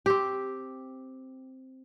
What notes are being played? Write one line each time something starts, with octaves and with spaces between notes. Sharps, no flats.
C4 G4